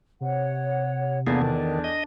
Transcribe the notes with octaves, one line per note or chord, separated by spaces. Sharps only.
C3 C#5 F#5
E2 A#3 B3 D4 G#4 A4 A6
D#3
D#5